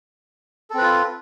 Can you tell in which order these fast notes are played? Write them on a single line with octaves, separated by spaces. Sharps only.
A4 C4 B4 F4